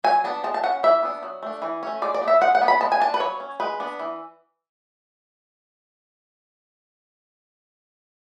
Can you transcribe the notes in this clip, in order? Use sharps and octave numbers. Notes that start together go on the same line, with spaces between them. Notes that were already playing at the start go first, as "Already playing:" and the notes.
F#3 G#5
B3 D4 A5
G#3 A5
A5
C#4 F#5
E3 E5
B3 D4
F#3
A3 D4
E3
A3 C#4
G#3 D5
D5
B3 D4
E5
G#3 F#5
F#5
B3 D4
B5
G#3 A5
G#5
D4 A5
B4
F#3 C#5
C#4
G#3 B4
B3 D4
E3